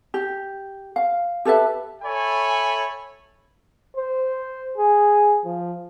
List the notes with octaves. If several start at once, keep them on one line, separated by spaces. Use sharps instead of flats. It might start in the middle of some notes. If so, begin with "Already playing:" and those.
G4
F5
G4 A4 B4 E5
A4 C#5 E5 G#5 B5
C5
G#4
F3